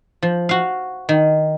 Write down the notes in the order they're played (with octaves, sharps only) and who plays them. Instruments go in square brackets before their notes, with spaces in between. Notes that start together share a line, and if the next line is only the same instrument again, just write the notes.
[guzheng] F3
F#4 F5
D#3